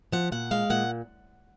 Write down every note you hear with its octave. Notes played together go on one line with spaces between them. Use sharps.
F3 F#5
A#2 F#5
G#3 F5
A#2 F#5